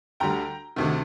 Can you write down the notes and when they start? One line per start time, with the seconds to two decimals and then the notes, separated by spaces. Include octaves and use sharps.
0.20 D2 D3 G3 G5 A#5
0.76 D2 C3 D#3